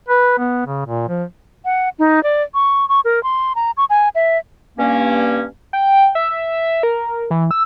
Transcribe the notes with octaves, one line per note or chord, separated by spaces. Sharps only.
B4
B3
C#3
A#2
F3
F#5
D#4
D5
C#6
C#6
A#4
C6
A#5
C#6
G#5
E5
G2 A#3 C#4
G5
E5
A#4
E3
E6